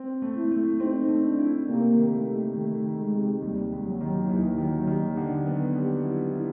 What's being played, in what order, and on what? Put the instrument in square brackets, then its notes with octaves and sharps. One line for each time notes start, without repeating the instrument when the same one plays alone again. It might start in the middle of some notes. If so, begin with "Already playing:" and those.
Already playing: [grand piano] C4
A3
[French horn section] E4
[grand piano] A3
[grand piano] C4 [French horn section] D#4
[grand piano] A3
[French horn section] D4
[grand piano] E4
[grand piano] C3 [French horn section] A#3
[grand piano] D#3
[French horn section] A3
[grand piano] G3
[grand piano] D#3 [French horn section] A3
[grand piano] D#3
[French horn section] G#3
[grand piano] C3
[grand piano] D#2 [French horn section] G3
[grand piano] D#2
[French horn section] F#3
[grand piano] D#3
[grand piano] D#2 [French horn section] E3
[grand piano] D#3 [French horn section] F#3
[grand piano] D#3 [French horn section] G3
[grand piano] D3 [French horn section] F#3
[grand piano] B3
G3
E4
E4